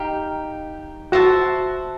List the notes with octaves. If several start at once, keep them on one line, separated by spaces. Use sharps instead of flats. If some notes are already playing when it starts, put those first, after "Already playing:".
Already playing: D#4 G4 F5
F#4 C5 E5 A5